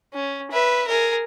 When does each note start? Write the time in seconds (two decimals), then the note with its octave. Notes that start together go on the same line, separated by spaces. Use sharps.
0.14 C#4
0.51 B4 E5
0.88 G#4 A#4